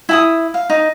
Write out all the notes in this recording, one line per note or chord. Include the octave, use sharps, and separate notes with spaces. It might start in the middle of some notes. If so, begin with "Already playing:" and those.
E4 G#5 D#6
F5
D#4